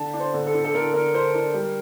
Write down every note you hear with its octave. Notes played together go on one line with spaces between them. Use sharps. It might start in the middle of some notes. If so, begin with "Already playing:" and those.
Already playing: D3 A5
D4
C5
D3
A4
D3
A4
D3 A#4
D3 A#4
D4 C5
D4 A#4
G3